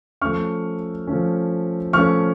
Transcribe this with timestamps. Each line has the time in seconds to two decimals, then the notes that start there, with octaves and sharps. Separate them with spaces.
0.21 F3 A3 C#4 C#6 F6
1.07 F3 A3 C#4
1.93 F3 A3 C#4 C#6 F6